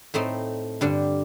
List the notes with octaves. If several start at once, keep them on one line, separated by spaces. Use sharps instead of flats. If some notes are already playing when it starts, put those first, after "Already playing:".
A2 A3 C4 D#4
G2 D3 G3 D4